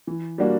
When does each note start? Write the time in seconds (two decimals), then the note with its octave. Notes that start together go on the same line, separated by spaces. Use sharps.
0.07 E3
0.38 G3 A#3 D4 F#4